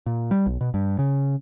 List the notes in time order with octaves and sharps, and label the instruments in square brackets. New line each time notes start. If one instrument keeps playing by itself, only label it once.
[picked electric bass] A#2
G3
B1
B2
G2
C#3